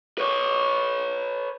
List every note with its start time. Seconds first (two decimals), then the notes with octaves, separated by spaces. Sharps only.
0.18 B4 C#5